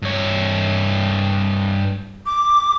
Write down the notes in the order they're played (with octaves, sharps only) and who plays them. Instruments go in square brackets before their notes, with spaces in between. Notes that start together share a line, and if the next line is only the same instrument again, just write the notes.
[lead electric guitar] G2 C#5
[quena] D6